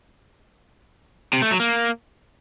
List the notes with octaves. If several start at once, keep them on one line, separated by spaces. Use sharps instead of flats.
C3
A3
F#3
A#3